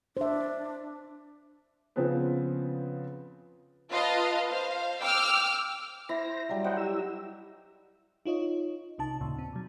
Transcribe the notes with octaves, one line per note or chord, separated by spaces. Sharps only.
D4 C5 E5
C#3 F3 B3 C4 G#4 B4
F4 B4 D#5 F5 A5
C5 F5
G5 D6 E6 F6
E4 C5 A#6
F#3 G3
C5 D#5 F#5 G5
E4 G4 E6
D#4 F4 C#5 D#5
C2 C3 D#4 A5
D#2 A#2 C#3
C4
B2 F#3